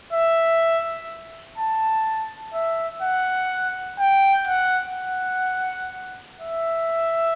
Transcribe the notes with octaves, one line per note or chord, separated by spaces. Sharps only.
E5
A5
E5
F#5
G5
F#5
F#5
E5